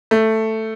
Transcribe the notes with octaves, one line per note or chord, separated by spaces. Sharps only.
A3